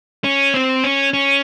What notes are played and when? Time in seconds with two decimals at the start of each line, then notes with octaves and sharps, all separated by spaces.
0.24 C#4
0.54 C4
0.84 C#4
1.13 C#4